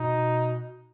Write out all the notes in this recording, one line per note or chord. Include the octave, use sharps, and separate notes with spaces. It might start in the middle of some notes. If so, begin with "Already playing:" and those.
Already playing: B2 D#4